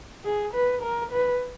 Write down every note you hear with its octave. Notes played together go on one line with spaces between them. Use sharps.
G#4
B4
A#4
B4